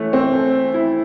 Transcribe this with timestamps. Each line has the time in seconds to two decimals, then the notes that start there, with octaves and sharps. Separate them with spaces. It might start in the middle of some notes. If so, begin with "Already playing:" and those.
Already playing: E3 A3 C#4
0.13 C4
0.33 A4
0.74 E4